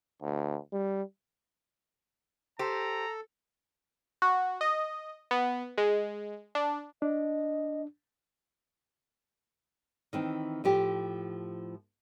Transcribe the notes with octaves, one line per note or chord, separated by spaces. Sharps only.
D2
G3
G4 A4 C5 A#5
F#4
D#5
B3
G#3
D4
D4 D#5
D#3 E3 C4
A2 F3 G4